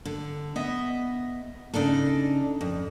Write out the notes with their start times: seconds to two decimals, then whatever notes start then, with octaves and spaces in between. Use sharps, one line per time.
0.05 D3
0.56 B3 D#5 E5
1.74 C#3 D4 D#4 A4
2.61 F2